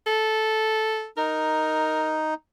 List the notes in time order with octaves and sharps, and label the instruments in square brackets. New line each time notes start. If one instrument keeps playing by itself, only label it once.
[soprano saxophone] A4
[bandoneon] D#4 [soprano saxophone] A#4